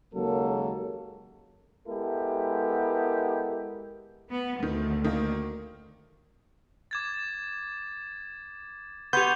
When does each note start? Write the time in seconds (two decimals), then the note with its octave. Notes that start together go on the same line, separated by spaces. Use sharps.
0.14 D#2 C#3 F#3 G#3 A#3 A4
1.87 G#3 B3 E4 G4 A4 A#4
4.30 B3
4.63 D2 D#3
5.04 D#3 A#3
6.91 D6 G#6 A6
9.13 B3 G4 C6 C#6 G6 G#6 F7